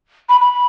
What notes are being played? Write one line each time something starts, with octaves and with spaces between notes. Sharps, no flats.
B5
B5